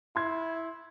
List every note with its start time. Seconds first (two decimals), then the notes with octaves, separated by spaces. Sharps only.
0.16 E4 C6 G#6